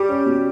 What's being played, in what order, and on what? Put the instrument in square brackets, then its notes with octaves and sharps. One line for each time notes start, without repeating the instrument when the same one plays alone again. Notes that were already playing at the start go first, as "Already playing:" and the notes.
Already playing: [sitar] G3 [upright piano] G4
[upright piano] C#4
B2